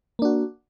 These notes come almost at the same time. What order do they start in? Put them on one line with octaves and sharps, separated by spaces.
A#3 D4 F#4